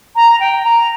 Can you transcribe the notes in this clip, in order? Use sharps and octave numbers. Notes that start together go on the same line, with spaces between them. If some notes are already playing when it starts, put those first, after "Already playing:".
A#5
G5
A#5